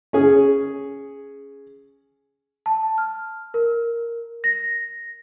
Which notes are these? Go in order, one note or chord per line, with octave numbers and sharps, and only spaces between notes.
C#4 G#4
A5
F6
A#4
A#6